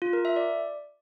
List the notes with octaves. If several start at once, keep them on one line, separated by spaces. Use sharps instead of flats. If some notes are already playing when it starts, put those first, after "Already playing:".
F4
A#4
E5
D5